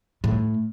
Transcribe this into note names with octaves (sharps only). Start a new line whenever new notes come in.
A2